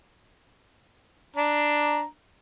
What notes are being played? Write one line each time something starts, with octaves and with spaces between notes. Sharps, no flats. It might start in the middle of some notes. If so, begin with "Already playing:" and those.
D4 A#5